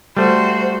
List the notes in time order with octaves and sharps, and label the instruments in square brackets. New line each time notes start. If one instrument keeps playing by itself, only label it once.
[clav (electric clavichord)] G3 A3 [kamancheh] F#4 C5